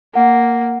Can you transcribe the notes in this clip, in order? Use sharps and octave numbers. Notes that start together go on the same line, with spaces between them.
A#3 F#5